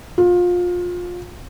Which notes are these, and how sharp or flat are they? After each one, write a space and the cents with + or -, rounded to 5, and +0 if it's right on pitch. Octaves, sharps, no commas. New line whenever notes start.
F4 +25